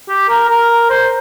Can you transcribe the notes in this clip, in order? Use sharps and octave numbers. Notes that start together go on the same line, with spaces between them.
G4
A#4
A#4
C5